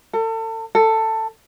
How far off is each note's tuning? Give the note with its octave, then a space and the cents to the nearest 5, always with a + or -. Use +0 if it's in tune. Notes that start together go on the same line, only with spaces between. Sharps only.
A4 +35
A4 +15